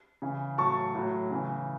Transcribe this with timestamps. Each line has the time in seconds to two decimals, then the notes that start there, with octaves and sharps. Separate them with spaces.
0.22 C#3 E3
0.58 A2 F#3 A5 C#6
0.95 A2 F#3
1.31 C#3 E3